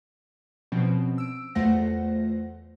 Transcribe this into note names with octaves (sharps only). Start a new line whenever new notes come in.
B2 F3 C4 C#4
E6 D7
E2 A3 F4 C5 F#5 A#6